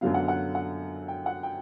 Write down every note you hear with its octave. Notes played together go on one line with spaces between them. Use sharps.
F#2 D3 F#3 B3 F5
F#5
F#5
F#5
G5
F#5
G5